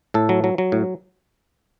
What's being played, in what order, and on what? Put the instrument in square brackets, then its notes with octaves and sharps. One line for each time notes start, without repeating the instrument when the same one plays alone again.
[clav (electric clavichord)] A2 A4
F#3
F#3
F#3
A2